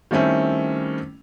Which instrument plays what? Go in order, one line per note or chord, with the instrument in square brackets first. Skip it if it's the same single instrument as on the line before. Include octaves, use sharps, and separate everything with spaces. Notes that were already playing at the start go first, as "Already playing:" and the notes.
[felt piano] D#3 G3 A3 C4 C#4 E4